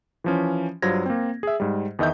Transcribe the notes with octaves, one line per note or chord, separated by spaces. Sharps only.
E3 F3 C#4
G2 F#3 F4 C5 G#6 A#6
A#3 C4
G#4 E5
G#2 G3
E2 D#3 D#5 E5 G6